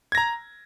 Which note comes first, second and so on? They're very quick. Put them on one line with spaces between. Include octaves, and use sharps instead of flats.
G#6 A#6 A#5